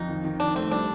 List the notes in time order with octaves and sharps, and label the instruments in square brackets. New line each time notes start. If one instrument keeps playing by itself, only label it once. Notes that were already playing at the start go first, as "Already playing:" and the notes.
Already playing: [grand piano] F2 [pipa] D#4
[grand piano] D#3
D#3
[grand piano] D#3 [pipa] D4
[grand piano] A3 [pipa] C4
[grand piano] G3 [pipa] D4